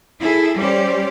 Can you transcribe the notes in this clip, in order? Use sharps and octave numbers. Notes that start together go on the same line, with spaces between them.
E4 G#4 A4
G3 C#4 G4 C5 D5